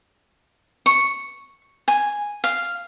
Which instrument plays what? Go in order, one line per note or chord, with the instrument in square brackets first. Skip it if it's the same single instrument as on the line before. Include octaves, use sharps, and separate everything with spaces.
[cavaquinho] C#6
G#5
F5